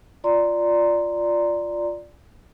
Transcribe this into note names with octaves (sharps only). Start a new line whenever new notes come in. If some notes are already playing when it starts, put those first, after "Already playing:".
F4 D5 A#5 C6